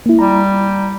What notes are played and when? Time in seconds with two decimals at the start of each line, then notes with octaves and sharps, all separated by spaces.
0.06 A#3 E4
0.19 G3 A#5